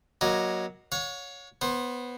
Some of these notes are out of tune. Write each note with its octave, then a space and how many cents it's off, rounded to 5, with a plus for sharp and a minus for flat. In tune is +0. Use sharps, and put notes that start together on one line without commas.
F#3 +0 A#3 +25 D#5 -5
C#5 +10 F#5 -45
B3 +0 C5 +20